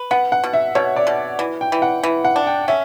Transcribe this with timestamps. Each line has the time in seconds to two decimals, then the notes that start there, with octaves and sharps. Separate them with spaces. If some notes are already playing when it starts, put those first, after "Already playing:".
Already playing: B4
0.11 B3 F#5
0.32 F#5
0.44 B2
0.53 E5
0.75 B2 C#5
0.96 D5
1.07 B2
1.39 E3
1.61 G5
1.72 E3
1.82 F#5
2.03 E3
2.25 F#5
2.36 D4
2.47 G5
2.68 C#4 E5